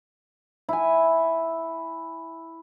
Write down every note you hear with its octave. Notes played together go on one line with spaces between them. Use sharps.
E4 G#5